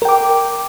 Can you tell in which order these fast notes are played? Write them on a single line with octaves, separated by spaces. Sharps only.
A#4 G5 D6